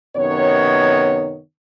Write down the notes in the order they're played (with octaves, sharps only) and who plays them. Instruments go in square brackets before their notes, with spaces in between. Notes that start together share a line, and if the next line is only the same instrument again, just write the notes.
[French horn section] F#2 C3 D#3 B3 C#5